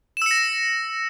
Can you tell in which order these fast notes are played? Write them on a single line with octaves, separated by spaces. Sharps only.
E7 E6 C#7 A#6